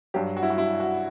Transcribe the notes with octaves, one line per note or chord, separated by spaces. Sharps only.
G2 F#3 G4
F#4
E4
F#4
E4
F#4